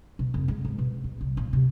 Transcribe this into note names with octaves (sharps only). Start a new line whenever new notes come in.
B2
F1
G#3
G#2
B2
A#1
C2
A#2
C3